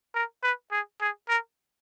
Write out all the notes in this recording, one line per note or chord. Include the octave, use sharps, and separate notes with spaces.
A#4
B4
G#4
G#4
A#4